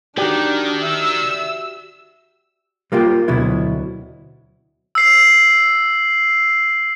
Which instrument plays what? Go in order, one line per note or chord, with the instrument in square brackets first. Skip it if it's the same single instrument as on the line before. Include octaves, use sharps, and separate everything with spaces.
[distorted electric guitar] D#3 [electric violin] D4 [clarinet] D#4 [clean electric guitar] F#4 G4 D5
[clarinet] E5 [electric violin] E6
[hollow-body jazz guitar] G3 A#3 F4 G4
D2 B2 F#3 E4
[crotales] E6 C7